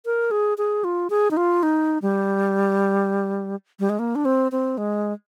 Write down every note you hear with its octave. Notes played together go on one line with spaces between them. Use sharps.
A#4
G#4
G#4
F4
G#4
D#4
F4
D#4
G3
G3
G#3
A#3
D4
C4
C4
G#3